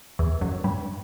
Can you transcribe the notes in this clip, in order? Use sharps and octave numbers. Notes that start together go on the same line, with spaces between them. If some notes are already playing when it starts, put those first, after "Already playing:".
E2 E3
F#2 F#3
G2 G3